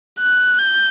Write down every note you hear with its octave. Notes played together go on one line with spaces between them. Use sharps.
F#6
G6